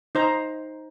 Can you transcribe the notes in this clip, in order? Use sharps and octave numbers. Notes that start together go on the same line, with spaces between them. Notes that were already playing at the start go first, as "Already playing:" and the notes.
D#4 C5 A#5